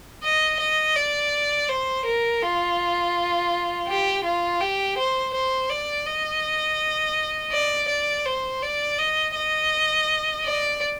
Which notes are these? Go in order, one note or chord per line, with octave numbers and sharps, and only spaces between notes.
D#5
D#5
D5
C5
A#4
F4
G4
F4
G4
C5
C5
D5
D#5
D5
D5
C5
D5
D#5
D#5
D5